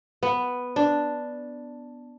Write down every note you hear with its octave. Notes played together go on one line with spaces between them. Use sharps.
B3
D4